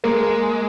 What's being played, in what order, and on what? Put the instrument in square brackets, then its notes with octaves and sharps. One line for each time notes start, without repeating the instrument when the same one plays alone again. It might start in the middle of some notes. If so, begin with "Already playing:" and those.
[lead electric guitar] G#3 [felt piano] A#3